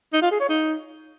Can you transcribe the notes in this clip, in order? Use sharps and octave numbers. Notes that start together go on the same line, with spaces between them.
D#4
F4
G#4
C#5
D#4